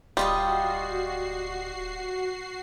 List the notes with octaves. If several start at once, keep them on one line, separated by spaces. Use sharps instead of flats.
D1 G3 F4 F#4 D#5 G5 C7